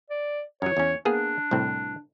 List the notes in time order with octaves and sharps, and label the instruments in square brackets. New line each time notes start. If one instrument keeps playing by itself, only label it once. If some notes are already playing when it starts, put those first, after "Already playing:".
[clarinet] D5
[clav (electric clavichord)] F#2 F#3 [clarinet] C#5
[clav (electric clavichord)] E2 C#4
[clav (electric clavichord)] A#3 B3 G#4 [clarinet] D4
[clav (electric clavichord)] C2 A2 C4